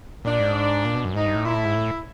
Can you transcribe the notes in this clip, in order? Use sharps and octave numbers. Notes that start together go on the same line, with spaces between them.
A#2 D4
G#2
A#2
B2
F#2
G#2 D#4
G2
A2
A#2 E4
A2
G#2
A2